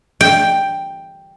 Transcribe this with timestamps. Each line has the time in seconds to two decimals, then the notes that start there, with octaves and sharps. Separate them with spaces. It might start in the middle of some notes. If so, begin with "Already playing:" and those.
0.21 G5